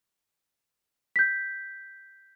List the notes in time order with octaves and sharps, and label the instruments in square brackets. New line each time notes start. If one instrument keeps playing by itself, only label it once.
[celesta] G6 B6